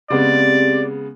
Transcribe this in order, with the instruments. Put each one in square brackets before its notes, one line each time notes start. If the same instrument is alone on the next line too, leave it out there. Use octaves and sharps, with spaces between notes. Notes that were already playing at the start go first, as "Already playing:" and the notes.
[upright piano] C#3 G#3 B3 [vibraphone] C4 G4 [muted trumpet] D5